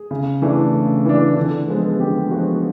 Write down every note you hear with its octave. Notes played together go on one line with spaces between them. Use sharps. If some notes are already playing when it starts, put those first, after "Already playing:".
Already playing: G#4
C#3
E3 A3 D4
C#3
E3 A3 D4
D3
F3 G#3 B3
D3 G4
F3 G#3 B3 F#4